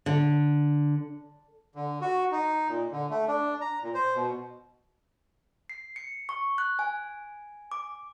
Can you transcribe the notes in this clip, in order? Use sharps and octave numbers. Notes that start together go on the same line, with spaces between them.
D3
D3
F#4
D#4
A#2
D3
A3
D4
A#5
A#2
C5
B2
C7
C#7
C#6
F#6
G#5
D6